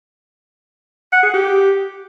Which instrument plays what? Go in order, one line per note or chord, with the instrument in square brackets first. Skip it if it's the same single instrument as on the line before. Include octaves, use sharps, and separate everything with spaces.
[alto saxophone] F#5
G#4
G4